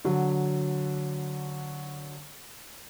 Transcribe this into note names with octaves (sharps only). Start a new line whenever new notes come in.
D3 F#3